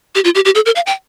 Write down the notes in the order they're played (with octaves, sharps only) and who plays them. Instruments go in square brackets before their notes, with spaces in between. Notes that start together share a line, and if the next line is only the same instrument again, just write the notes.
[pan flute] G4
F4
G4
G4
A4
A#4
F5
G5